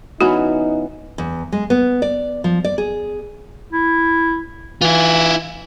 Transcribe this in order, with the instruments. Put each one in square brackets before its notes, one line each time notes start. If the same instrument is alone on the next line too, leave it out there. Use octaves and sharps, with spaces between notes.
[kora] E3 B3 C#4 [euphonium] D#4 [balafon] F#4
[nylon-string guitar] E2
G#3
B3
D5
F3
D5
G#4
[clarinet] E4
[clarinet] E3 [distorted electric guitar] E4 F4